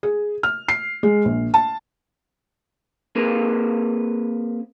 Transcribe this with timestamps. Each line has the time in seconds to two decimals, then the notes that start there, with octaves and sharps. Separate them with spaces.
0.03 G#4
0.43 F6
0.69 C7
1.03 G#3
1.25 A#1
1.54 A5
3.15 A#3 C4 G#4 A#4 B4